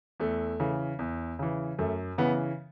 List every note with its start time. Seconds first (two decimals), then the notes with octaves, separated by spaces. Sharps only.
0.20 E2 A3
0.60 C#3 E3
0.99 E2
1.39 C#3 E3
1.79 F#2 A3
2.18 C#3 E3 B3